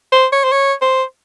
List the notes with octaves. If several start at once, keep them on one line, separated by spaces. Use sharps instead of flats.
C5
C#5
C5
C#5
C5